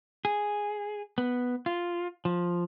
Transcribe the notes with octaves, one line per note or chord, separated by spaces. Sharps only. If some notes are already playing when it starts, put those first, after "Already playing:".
G#4
B3
F4
F3